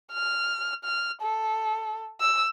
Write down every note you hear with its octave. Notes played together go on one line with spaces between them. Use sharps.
F6
F6
A4
E6